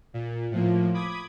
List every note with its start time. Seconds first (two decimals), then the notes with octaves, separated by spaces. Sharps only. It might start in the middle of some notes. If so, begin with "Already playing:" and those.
0.14 A#2
0.51 A2 F3 A#3
0.94 B5 D6 D#6 G#6